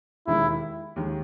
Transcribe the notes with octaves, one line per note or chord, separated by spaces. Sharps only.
E1 D#2 D#3 G#3 D#4 E4
D#2 D#3 G#3